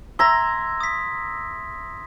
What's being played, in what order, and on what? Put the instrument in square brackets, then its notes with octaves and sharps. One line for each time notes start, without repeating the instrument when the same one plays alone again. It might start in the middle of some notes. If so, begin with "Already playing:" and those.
[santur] E5 A#5 [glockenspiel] C6 G#6 A#6
[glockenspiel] D#6 B6